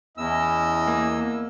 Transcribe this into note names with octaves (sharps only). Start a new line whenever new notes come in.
E2 C#4 E4 D#5 E6
A#3